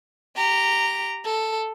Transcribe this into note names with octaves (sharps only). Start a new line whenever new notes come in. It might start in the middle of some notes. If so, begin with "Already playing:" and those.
G4 A#5
A4